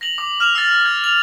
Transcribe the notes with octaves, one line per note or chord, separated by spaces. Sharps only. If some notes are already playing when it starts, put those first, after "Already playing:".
A#6 F7 F#7
D6
F6 E7 F7
E6 A6
G#6
F7